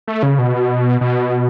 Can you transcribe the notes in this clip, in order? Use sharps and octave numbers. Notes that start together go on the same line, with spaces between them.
A3
C#3
B2
B2